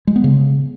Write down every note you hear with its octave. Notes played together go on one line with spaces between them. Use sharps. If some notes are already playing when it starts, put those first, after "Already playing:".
G#3
B3
C#3